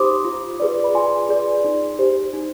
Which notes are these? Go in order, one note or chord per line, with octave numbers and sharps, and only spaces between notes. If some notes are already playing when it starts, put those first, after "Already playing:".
Already playing: D#4 G4 C5 B5 C6 D6 D#6
F4
G#4 B4 D5
B5
F4 G#5 C6
G#4 B4 D5
D#4
G4 C5
D#4